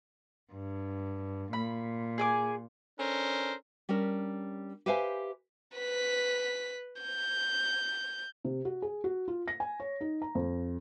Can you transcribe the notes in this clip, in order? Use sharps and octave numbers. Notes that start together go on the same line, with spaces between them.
G2
A#2 B5
G#4 G#5 D6
C#4 D4 A4 A#4 C5
G3 C#4 D4 A#4
G4 B4 C5 E5 F5 G#5
B4 B6
G6
C3
F#4
G#4
F#4
F4
A#6
G#5
C#5
D#4
A#5
F2